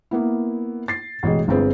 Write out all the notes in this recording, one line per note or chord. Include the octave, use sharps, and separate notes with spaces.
A#3 B3 E4
A6 C7
A1 B2 G#3 D#5
G1 D3 G#3 C4 G#4 B4